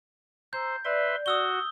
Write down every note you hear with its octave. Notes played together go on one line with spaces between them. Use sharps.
C5 A#5 E6 G6
B4 D5 E5 C6
F#4 D#6 E6 G7